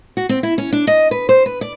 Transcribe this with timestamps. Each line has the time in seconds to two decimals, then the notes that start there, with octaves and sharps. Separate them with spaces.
0.17 F#4
0.29 C4
0.43 E4
0.58 C#4
0.73 D4
0.87 D#5
1.11 B4
1.29 C5
1.46 B4
1.61 D5